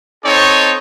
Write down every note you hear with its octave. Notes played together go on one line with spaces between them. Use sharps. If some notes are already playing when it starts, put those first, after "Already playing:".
C4 D#4 A4 C#5